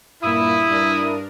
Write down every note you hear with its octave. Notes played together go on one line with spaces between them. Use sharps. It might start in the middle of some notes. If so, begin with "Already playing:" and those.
G2 A#2 A#3 E4 D#6
G2 D4 A#4